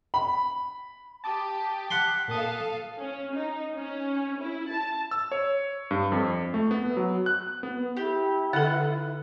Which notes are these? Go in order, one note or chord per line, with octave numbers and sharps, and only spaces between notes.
B5
G4 A5 D6 D#6
F#5 B5 C6
A#2 A4 F5 A5 D#6
C#4
D#4
C#4
E4
A5
E6
C#5
G2
F2
A3
B3
F#3
F#6
B3
E4 G4
D3 A4 F#5